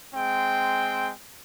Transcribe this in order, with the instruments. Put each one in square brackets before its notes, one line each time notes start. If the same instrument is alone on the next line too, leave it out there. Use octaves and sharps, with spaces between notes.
[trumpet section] G#3 C4 G5